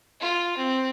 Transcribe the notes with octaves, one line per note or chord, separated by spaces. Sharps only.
F4
C4